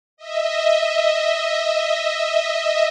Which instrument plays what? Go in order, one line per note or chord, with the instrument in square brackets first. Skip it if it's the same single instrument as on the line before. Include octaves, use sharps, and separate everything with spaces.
[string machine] D#5 E5